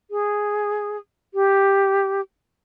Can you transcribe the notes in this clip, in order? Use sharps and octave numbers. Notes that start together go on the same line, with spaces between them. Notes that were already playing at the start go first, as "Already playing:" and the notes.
G#4
G4